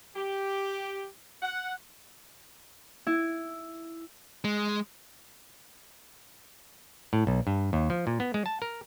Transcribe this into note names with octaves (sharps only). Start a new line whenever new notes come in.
G4
F#5
E4
G#3
A2
B1
G2
D#2
F3
A#2
B3
G#3
A5
A#4